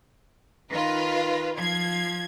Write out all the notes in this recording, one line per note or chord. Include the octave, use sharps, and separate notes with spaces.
D#3 F4 B4
F3 G#6